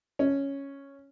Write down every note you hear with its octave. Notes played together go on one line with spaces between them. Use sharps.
C#4